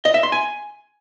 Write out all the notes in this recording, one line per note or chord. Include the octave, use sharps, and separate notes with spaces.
D#5
E5
C6
G#5